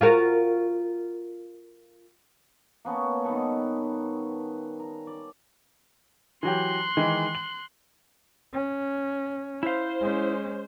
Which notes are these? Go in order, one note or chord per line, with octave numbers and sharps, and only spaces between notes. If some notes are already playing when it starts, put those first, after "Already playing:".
F4 F#4 A#4
A#3 B3 C#4 A5
D#3 G3 B3 A4
A#5
D5
E3 F#3 G4 C6 F#6
D#3 E3 G#3
F#7
C#4
E4 C5 F5
G#3 C#4